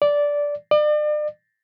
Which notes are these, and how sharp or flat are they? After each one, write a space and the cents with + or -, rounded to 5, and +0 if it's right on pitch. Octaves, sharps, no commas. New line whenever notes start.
D5 -10
D5 +40